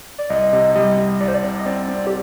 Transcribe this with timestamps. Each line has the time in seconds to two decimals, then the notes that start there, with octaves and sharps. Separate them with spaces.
0.18 D5
0.30 C2 D#5
0.53 C3
0.75 G3 D#5
0.98 G3
1.20 C2 D5
1.28 C5
1.34 D5
1.44 C3
1.58 D#5
1.66 C4 D5
1.88 C4
2.07 G4